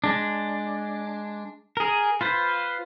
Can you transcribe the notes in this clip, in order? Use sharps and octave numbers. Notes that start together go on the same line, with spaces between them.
G#3 D4
G#4 A#4
F4 B4 C5